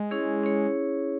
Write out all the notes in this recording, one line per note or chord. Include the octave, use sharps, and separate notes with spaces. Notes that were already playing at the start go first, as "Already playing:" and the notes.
Already playing: G#3
C#4 E4 G#4 C#5
C#4 E4 G#4 C#5